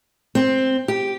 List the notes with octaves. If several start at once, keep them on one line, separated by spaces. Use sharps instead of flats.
C4
G4